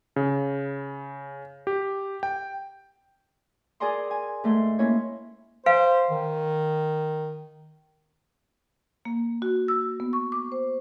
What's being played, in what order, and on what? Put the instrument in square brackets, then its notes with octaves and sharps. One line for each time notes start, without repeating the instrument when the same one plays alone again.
[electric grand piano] C#3
G4
G5
[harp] G#4 A#4 D5 G#5 A#5 C6
G#5
G#2 A3 C6
A#3 C#4 E4 C#5
[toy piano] B4 F5 G#5 [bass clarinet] C5
[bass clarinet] D#3
[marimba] A#3
F#4
E6
B3
C#6
D6
C5